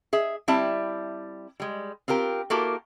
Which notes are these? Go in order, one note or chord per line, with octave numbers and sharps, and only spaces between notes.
G#4 E5
G3 C4 E4 D5 E5 A5
G3 G#3
C4 F4 G4 A#4
A#3 E4 F#4 G4 A4 A#4